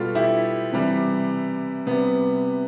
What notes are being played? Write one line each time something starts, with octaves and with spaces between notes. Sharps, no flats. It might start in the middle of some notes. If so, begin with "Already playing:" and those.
Already playing: B2 G3 F4 A4
E4 G4
C3 E3 G3
C3 G3 B3